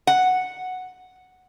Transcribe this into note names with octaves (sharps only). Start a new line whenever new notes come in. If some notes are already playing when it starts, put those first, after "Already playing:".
F#5